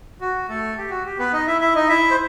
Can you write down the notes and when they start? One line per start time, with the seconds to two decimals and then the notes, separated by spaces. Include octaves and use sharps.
0.21 F#4
0.49 A3 A4
0.77 G4
0.90 F#4
1.05 G4
1.19 B3 B4
1.33 D#4 D#5
1.47 E4 E5
1.61 E4 E5
1.75 D#4 D#5
1.89 E4 E5
2.11 C5